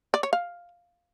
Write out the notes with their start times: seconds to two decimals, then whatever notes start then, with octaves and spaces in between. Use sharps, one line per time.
0.14 D5
0.23 C#5
0.33 F5